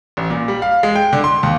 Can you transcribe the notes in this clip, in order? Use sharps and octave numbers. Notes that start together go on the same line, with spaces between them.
A1
A#2
G3
F5
G#3
G5
D3
C6
D#2